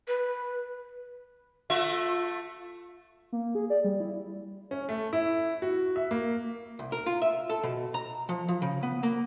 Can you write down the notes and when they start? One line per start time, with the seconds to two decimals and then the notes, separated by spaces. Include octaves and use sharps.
0.08 B4
1.70 A3 F4 E5
3.32 A#3
3.55 G#4
3.70 D5
3.84 G3
4.00 E4
4.71 C#4
4.89 A3
5.13 E4
5.62 F#4
5.96 E5
6.11 A#3
6.79 C2
6.92 A#4
7.06 F4
7.22 E5
7.50 A4
7.63 B2
7.94 A#5
8.29 F3
8.48 F3
8.62 C#3
8.83 B3
9.03 A#3